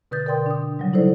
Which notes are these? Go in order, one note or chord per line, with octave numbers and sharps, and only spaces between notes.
B2 D3 B4 D#6 G6 A6
A#4 D5 G5 C6 D#6
D4 D#6
C#3 F#3 G3
D#4 E4 A4 C5 D5